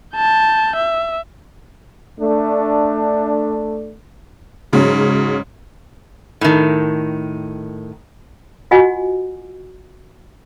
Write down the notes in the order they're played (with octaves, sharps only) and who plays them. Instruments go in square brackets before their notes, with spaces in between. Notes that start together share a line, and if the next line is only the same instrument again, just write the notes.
[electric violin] A5 G6
E5
[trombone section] A3 D4
[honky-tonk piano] G#2 C#3 F#3 C#4
[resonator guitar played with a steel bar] A2 D#3
[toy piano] F4 F#4 D#5 F#5 G#5